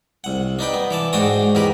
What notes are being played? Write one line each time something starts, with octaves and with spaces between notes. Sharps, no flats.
C2 F#5
D4 D#4 B4 G5
B3
E3 D5 A5
G#2 D4 F#4 G5 C#6 D#6
E2 D#3 G4 A#4 B4